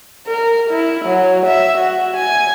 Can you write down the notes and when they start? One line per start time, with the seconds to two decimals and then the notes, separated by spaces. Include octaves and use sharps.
0.27 A#4
0.70 E4
1.05 F#3
1.46 E5
1.78 F#4
2.17 G#5